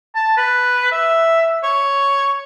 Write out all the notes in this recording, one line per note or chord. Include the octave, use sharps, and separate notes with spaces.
A5
B4
E5
C#5